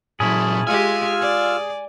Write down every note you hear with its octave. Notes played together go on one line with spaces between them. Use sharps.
A#2 F#3 C#4 E4 G#4 A5 B5
G#3 F4 G4 G#5 E6 F6
D5